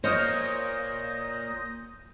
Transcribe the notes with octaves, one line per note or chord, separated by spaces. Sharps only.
A#2 C5 C#5 D#5 D#6 F6 G6 A#6